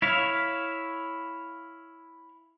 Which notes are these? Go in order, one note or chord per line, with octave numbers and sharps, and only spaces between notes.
E4 C#5 F5